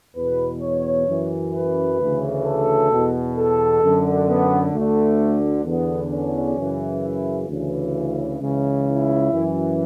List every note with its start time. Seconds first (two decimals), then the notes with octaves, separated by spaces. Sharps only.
0.16 E2 B2 B4
0.62 C#5
1.08 F#2 E3
1.54 B4
1.99 D2 C#3 E3
2.45 A4
2.91 E2 B2
3.36 A4
3.82 F#2 D3
4.28 B3
4.74 D2 D3 A3
5.65 E2 D3 B3
6.12 C#4
6.57 F#2 C#3 E3
7.03 E4
7.49 D2 C#3 E3
8.40 C#2 C#3 E3
8.86 E4
9.32 F#2 E3